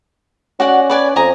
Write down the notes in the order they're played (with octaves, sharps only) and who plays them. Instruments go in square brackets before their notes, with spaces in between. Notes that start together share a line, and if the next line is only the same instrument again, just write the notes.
[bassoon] C#4 [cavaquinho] F#4 D5 F#5
[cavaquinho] B4 D5 G#5
[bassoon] F2 [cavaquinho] D#5 G#5 A#5